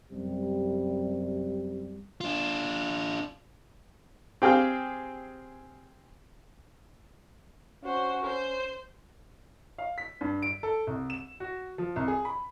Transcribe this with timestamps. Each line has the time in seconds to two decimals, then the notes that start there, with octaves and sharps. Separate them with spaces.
0.11 F#2 C3 G3
2.21 D4 F4
4.42 C4 G4 G#4 F5 G5
7.84 C#4 F#4 C5
8.23 C5
9.78 F5
9.98 B6
10.21 G2
10.42 D7
10.63 A4
10.87 C2
11.10 E7
11.40 F#4
11.78 F3
11.96 C2
12.08 G#4
12.25 B5